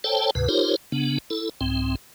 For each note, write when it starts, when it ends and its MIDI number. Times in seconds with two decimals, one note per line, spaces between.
0.04 0.31 69
0.04 0.31 72
0.04 0.31 73
0.04 0.31 79
0.04 0.31 81
0.35 0.48 38
0.35 0.48 44
0.35 0.48 48
0.35 0.48 71
0.49 0.76 63
0.49 0.76 65
0.49 0.76 67
0.49 0.76 70
0.49 0.76 72
0.49 0.76 73
0.92 1.18 49
0.92 1.18 59
0.92 1.18 62
1.30 1.49 64
1.30 1.49 69
1.61 1.95 36
1.61 1.95 44
1.61 1.95 60